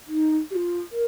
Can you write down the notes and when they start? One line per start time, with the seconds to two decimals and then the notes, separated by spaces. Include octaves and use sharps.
0.07 D#4
0.50 G4
0.55 F4
0.92 A#4